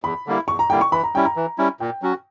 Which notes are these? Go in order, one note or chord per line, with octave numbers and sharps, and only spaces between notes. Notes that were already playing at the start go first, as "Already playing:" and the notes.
E2 B5
D3 G3 A#3 E4
E2 C#6
A#5
D3 G3 A#3 E4 G5
C#6
E3 B5
A#5
G3 C#4 E4 G5
A#5
E3
G3 C#4 E4
A#2 G5
F#3 C#4 F#4